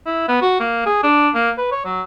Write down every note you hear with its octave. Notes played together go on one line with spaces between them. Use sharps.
E4
B3
F#4
A#3
G#4
D4
A#3
B4
C#5
F#3